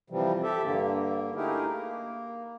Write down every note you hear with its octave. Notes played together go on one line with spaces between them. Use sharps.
C3 E3 F3 G3
G4 A4 E5
G2 D3 A#3
A3 D#4 E4 G4 G#4 A#4
A#3